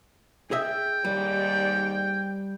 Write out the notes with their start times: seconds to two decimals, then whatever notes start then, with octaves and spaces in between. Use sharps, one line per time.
0.51 G#4 D#5 E5 G5
1.05 D#2 G#2 G3 D5